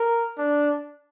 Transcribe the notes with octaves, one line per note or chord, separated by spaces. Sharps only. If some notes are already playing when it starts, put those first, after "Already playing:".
Already playing: A#4
D4